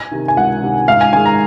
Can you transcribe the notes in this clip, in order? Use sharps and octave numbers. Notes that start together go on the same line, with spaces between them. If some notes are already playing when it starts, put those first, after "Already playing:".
Already playing: G#5
C3 D#3
G#5
C#2 F#5
C3 D#3
G#2 F5
G#5
D#3 G#3 G#5
A#5